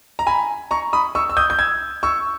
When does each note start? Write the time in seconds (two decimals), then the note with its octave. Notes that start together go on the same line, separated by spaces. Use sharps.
0.19 A#5
0.27 G#5 B5
0.71 A#5 C#6
0.93 B5 D#6
1.15 C#6 E6
1.30 E6
1.37 D#6 G6
1.50 G6
1.59 E6 G#6
2.03 C#6 E6